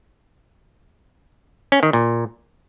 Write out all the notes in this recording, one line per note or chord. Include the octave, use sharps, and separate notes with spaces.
C#4
D#3
A#2